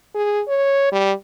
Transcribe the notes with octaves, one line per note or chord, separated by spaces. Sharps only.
G#4
C#5
G3